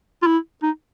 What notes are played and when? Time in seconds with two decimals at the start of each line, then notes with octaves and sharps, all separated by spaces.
0.22 F4
0.27 E4
0.63 D#4